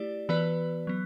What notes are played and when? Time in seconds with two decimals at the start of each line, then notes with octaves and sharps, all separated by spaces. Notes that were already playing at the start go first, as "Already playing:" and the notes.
Already playing: A3 E4 G4 D5
0.29 E3 B3 F#4 B4 D5
0.87 F#3 B3